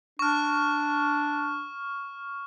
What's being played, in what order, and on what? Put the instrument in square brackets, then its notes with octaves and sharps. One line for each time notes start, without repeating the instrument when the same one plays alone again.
[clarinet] D4 [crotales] C#6 F6